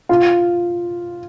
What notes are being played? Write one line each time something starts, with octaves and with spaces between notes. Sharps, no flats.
F4